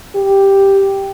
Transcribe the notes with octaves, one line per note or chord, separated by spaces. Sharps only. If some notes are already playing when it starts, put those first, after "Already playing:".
G4